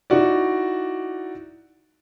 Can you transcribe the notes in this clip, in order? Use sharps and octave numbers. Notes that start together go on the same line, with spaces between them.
D#4 E4 F#4 D5